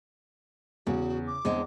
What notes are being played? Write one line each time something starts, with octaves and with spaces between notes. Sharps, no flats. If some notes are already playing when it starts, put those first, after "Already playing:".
E2 C#3 F#4
D6
E2 D3 G#3 C4